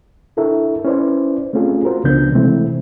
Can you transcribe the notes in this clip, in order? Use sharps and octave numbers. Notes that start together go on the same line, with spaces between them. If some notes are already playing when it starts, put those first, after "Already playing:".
D4 E4 A4 A#4 E5
C#4 E4 B4 C5 D5
A3 C4 C#4 F4 G#4
F4 F#4 A#4 C5
C#2 C#3 F3 B3 D4 G6
C3 E3 G#3 A3 C4 E4